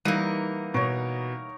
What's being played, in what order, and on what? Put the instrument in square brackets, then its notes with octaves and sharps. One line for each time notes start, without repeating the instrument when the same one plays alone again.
[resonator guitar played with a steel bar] E3 A#3 [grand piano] G3 [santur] D#4 F#5 [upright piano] D#7
[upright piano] B2 [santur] A#4 C#5